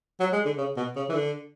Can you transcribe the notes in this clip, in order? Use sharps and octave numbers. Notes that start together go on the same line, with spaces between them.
F#3
G#3
D3
C#3
B2
C#3
E3
D3